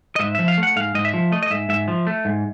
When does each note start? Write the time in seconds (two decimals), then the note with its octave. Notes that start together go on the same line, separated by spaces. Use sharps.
0.16 D#5
0.20 G#2 E5
0.35 F3 E5
0.48 F5
0.58 A3
0.63 F#5
0.76 G#2 F5
0.95 G#2 D#5
1.05 E5
1.14 F3
1.32 A3 D#5
1.43 D#5
1.50 G#2 E5
1.69 G#2 E5
1.88 F3
2.07 A3
2.25 G#2